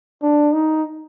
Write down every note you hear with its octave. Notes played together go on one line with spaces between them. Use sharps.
D4
D#4